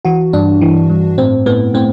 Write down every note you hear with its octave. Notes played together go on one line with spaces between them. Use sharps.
E3 F#4
G2 D4
E3
G2
A2 C4
A2 B3
A2 C4